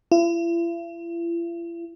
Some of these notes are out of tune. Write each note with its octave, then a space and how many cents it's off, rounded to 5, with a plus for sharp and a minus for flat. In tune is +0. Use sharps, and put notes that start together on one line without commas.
E4 +45